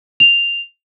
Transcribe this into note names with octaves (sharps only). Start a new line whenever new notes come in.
F7